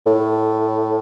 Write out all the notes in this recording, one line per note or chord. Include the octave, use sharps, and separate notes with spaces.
A2